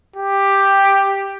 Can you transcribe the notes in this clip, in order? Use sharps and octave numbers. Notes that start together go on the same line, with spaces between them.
G4